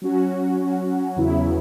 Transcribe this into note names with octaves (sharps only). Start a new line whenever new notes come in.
F#3 C#4 F#4
E2 C#3 F#3 B3 E4